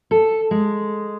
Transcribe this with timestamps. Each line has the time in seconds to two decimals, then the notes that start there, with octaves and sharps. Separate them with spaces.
0.11 A4
0.51 G#3